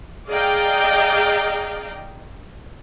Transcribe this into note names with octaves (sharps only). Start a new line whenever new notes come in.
G#4 D5 D#5 F5 G5 A#5